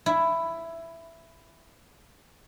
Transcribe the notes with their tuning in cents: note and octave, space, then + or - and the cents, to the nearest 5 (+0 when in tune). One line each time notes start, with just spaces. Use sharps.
E4 +10